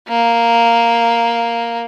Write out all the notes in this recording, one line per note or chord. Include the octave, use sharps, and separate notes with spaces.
A#3